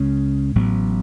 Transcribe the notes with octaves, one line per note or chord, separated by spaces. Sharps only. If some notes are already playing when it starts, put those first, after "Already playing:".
Already playing: C#2 C#3 G#3 C#4
A1 A2 F#3 B3